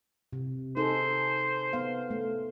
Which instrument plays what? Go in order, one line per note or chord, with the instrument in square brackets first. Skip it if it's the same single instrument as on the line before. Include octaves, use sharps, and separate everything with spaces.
[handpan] C3
[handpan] D#4 G#4 A4 [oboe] C5
[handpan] B3 F5
A3